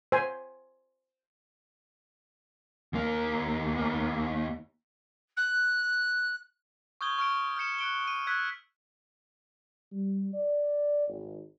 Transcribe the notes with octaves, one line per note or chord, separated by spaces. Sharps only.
C5 G#5
D#2 A#3
F#6
C#6 D#6 F6 G6 G#6 G7
C#6 F6 D7
F6 G6 C#7 E7
F#6 D7 G7
D#7
E6 F#6 G#6 B6
G3
D5
G#1